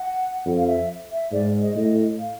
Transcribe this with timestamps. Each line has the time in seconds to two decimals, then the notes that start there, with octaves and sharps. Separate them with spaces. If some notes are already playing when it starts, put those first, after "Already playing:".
Already playing: F#5
0.46 F2
0.57 F5
0.67 E5
1.11 E5
1.32 G#2 D5
1.61 D#5
1.76 A2 D#5
2.19 F5